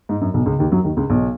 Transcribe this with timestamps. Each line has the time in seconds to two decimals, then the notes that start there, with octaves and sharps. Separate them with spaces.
0.09 G#2
0.21 F#2
0.34 B1 B2
0.46 C#2 C#3
0.59 D#2 D#3
0.71 F#2 F#3
0.84 D#2 D#3
0.97 C#2 C#3
1.10 B1 B2